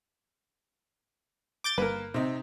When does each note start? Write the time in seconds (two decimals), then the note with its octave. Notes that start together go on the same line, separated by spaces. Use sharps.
1.64 D6 G6 A6
1.78 G1 A#3 A#4 B4
2.14 C3 C4 D#4